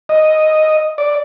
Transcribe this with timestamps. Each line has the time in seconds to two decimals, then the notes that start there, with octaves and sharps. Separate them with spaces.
0.09 D#5
0.98 D5